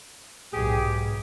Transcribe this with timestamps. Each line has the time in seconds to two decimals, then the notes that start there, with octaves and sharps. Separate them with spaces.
0.52 B1 G#2 G4 G#4